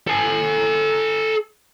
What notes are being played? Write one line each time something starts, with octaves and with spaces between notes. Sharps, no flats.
A4 G#5